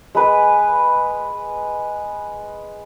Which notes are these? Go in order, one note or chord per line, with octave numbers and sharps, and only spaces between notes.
G#3 B4